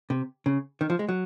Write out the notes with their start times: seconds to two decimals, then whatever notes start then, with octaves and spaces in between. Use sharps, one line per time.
0.10 C3
0.46 C#3
0.81 D#3
0.90 F3
0.99 G#3
1.09 F#3